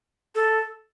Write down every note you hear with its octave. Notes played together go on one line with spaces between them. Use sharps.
A4